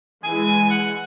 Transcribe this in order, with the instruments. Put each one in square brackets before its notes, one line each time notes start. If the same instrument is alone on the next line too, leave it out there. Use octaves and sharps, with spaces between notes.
[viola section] E3 G#3 [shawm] G#5
[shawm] F#5